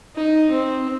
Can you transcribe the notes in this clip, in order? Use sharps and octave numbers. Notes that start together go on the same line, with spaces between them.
D#4
C4